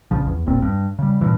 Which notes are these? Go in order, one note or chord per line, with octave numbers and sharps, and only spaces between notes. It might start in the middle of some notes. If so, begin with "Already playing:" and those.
A#1 C#3 F3
E2
E1 A#1 A#2 C4
G2
C#3 G3
G2 A#2 E3